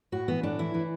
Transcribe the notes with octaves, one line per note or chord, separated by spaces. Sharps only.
A2 F#4
E3 B3
A2 D4
E3 E4
E3